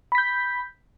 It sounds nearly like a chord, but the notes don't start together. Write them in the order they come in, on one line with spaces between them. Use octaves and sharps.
B5 B6 G6